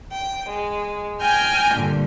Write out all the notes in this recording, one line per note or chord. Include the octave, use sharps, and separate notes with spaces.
G5
G#3
G5 G#5 F6 G6 A#6
G2 A#2 D3